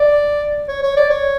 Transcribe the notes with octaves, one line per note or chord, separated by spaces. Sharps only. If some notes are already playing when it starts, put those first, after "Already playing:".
Already playing: D5
C#5
C#5
D5
C#5